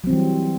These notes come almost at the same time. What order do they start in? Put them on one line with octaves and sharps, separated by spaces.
F#3 C4 E3 G3